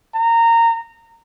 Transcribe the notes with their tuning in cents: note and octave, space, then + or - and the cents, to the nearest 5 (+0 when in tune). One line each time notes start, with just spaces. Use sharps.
A#5 -20